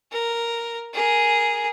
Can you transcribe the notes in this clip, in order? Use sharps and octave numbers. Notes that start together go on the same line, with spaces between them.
A#4
G#4 A#4